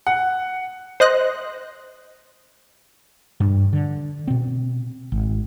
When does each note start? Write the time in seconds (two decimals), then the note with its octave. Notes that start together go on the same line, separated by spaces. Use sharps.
0.07 F#5
1.00 C5 D#5 F#6 A#6
3.40 G2
3.73 D3
4.28 B2 C4
5.12 G#1